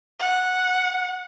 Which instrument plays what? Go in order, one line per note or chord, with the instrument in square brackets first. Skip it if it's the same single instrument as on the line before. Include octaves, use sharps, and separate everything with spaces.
[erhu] F#5